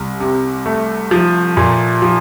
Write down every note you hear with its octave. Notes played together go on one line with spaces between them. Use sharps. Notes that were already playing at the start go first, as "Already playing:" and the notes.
Already playing: C2
C3
A3
F3
A#2
F3